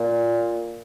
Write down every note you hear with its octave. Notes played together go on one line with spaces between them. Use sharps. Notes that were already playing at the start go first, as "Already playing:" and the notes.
Already playing: A#2